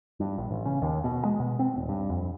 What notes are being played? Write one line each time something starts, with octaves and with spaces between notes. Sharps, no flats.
G2
A#1
A1
C#3
D#2
B2
G#3
B2
C4
D#1
G2
F2